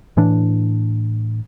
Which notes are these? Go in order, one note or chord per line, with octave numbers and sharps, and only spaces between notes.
A2 E3 D4